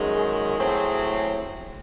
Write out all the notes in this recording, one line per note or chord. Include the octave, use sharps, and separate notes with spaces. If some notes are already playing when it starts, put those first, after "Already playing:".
Already playing: F#2 D#3 G#3
G#4
A2 F#3 C4